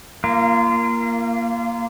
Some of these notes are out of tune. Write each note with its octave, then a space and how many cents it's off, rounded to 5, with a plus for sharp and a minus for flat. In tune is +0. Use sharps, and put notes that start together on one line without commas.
A#3 +0 F4 -30